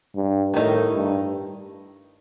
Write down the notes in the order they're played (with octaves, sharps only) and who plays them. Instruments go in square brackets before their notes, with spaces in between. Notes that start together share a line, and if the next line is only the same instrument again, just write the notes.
[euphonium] G2
[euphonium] A2 [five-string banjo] D#3 A3 D#4 A#4
[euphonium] G2